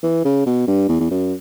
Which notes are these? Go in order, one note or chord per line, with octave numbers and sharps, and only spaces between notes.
E3
C#3
B2
G2
E2
E2
F#2